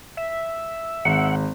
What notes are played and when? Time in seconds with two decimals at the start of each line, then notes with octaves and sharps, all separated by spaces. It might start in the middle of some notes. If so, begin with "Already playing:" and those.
0.17 E5
1.05 G#1 F#5